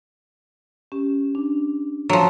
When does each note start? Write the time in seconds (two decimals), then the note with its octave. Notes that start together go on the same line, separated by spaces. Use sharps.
0.92 C#4 G4
1.35 D4
2.09 F3 F#3